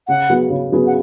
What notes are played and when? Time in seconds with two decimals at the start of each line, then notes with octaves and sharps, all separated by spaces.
0.08 C#3 F#5
0.30 F#3 B3 G#4
0.50 C#3
0.72 F#3 B3 G#4
0.87 F#5